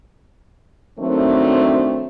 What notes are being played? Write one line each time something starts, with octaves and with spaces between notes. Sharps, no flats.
D#3 F#3 A3 C4 D4